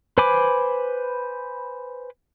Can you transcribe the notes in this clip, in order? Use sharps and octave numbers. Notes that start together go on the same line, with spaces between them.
B4 C5 G#5 B5 D6